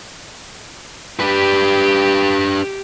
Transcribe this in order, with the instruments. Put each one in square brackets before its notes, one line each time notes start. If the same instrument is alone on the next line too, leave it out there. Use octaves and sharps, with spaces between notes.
[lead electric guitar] D4 B4 [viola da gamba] G4